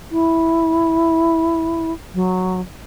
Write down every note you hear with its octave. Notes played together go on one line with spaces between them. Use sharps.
E4
F#3